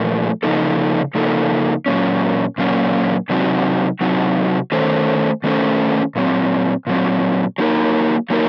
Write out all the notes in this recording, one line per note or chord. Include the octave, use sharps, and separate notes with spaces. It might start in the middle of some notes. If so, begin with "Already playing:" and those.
Already playing: A#2 F3 A3
C#3 F3 A#3 D#4 A4
C#3 F3 A#3 D#4 A4
A#2 F#3 A#3 C#4
A#2 F#3 A#3 C#4
C3 F#3 C4 D#4 F#4
C3 F#3 C4 D#4 F#4
D#3 A3 C#4 A4 C5
D#3 A3 C#4 A4 C5
A#2 F#3 C4
A#2 F#3 C4
F#3 A#3 D#4 A#4
F#3 A#3 D#4 A#4